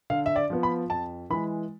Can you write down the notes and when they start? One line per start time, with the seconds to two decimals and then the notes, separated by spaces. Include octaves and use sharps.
0.10 D3 F5
0.26 E5
0.36 D5
0.50 F3 B3
0.63 B5
0.90 F2 A5
1.30 E3 G#3 B5